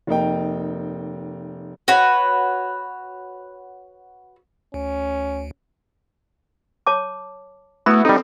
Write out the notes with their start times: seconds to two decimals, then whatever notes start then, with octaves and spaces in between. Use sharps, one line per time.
0.07 F1 A#3 D#4 G5
1.88 F#4 B4 C#5
4.74 D2 C#4
6.87 C#5 A5 D6
7.86 A3 B3 E4 F#4 B5 D#6
8.05 G3 C4 D#4 A4